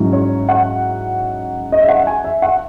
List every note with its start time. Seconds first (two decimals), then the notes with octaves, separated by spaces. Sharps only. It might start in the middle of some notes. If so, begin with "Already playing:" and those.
Already playing: G#2 F#3 C#4 E4
0.13 C#5
0.49 F#5
1.72 D#5
1.81 E5
1.89 F#5
2.07 G#5
2.24 E5
2.42 F#5